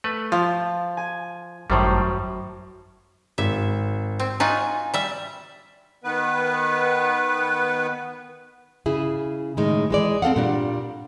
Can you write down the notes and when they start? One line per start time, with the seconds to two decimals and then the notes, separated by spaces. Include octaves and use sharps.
0.04 A3 B4
0.32 F3 F4
0.97 G#5
1.70 G#1 F#2 A2 D#3 G3 C5
3.38 G#1 E5
4.20 C4
4.40 D#4 F4 F#4 G#5
4.94 G3 E5
6.04 D#3 B3 B4
8.86 C#3 E4 G#4
9.57 A2 D#3 G#3 D#4
9.90 E3 G#3 D5
10.22 C4 A4 F5 F#5
10.36 A#2 G3 D4